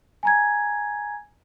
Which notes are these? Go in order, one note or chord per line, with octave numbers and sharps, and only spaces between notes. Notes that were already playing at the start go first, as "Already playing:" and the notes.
G#5 A#5 G#6